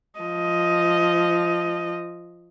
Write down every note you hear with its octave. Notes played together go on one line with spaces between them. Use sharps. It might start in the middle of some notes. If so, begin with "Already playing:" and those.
F3 D#5